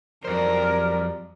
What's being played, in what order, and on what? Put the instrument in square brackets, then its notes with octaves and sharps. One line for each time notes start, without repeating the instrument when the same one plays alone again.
[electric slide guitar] F2 C5 [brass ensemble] F#3 G3 D5 [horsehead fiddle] A#4